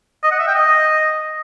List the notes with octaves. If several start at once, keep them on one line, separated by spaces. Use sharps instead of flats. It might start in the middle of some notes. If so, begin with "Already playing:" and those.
D#5
F#5
E5
G5
D#5